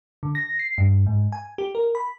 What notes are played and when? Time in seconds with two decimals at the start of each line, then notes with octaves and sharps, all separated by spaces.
0.23 D3
0.35 A#6
0.59 C7
0.78 G2
1.06 G#2
1.32 G#5
1.58 G4
1.75 A#4
1.95 B5